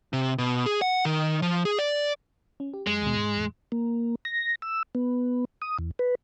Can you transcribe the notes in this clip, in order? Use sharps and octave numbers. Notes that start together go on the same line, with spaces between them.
C3
B2
G#4
F#5
D#3
F3
G#4
D5
C#4
G4
F#2 G#3
D#2 B2
G#2
E2 A2
A#3
A#6
E6
B3
D#6
E2
B4